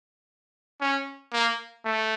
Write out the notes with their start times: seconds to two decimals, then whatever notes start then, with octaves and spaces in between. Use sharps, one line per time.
0.81 C#4
1.33 A#3
1.86 A3